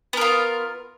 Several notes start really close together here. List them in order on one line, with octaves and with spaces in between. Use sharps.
B3 A#4 F4